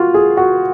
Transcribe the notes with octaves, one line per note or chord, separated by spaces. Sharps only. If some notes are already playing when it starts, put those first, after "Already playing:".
Already playing: F4 F#4
G#4
F#4